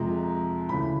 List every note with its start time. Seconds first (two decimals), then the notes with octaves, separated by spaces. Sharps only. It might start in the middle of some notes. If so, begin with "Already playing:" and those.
Already playing: F2 C3 F3 G#3 A#5
0.69 D2 C#3 E3 B5